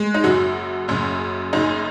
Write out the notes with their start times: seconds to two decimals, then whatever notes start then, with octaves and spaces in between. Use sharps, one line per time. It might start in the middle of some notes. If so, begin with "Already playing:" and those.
Already playing: G#3
0.14 D#4
0.23 F#1 F#2 C#3 F#4
0.88 F#1 F#2 C#3
1.53 F#1 F#2 C#3 D#4